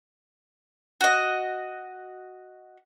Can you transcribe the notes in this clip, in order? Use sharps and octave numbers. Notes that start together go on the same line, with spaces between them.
F#4 D#5